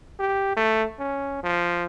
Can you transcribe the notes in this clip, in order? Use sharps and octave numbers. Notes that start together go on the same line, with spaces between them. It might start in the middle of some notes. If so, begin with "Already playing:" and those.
G4
A3
C#4
F3